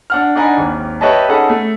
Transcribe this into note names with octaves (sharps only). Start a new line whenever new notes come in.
D4 F#5 F6
D4 D#4 F#5 G#5 A#5 B5
G#1 D#2
G4 B4 C#5 D#5 E5 A5
C#4 D#4 G#4 A4 F#5 B5
A3